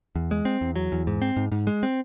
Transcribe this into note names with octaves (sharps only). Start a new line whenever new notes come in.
E2
G#3
C4
E2
F#3
E2
G#2
C4
G#2
G#2
G#3
C4